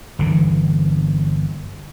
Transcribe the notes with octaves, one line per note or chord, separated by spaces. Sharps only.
G1 D3 E3